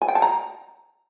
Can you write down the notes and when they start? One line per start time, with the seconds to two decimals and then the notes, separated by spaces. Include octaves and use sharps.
0.02 G#5
0.08 G5
0.15 A5
0.22 A#5